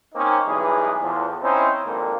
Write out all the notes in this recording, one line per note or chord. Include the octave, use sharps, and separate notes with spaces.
A#3 C4 C#4 D#4
B1 E3 G3 G#3 G#4 B4
E2 A2 F3
C4 C#4 D#4 E4 C5
G#1 F2 A#2 A#3